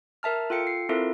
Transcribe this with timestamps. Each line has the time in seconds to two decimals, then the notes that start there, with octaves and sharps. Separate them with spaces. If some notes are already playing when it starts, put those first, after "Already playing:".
0.23 A#4 E5 A5 F6
0.50 F4 A4 G5 C#7
0.67 C7
0.89 C4 E4 F4 A4 A#4 E5